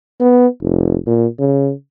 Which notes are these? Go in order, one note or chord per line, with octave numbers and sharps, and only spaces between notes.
B3
F1
A#2
C#3